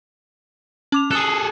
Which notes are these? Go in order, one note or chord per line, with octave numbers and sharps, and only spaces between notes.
C#4 D6 F7
G#4 A4 D#6 F#6